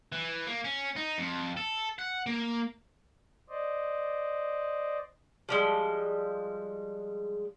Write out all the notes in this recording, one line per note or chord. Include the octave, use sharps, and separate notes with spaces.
E3
A#3
C#4
D#4
F2
A4
F#5
A#3
C5 D5 D#5
F3 G3 G#3